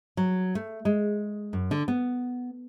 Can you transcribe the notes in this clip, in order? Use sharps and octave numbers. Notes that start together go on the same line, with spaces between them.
F#3
A3
G#3
F#2
D3
B3